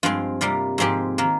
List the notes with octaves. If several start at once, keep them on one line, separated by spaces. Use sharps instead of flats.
G2 F3 G#3 C4 F4
C3 G3 A#3 F4
G#2 F3 G#3 C4 G4
D#3 A#3